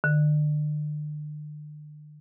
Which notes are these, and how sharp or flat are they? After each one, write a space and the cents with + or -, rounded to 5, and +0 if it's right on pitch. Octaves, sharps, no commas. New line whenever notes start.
D3 +40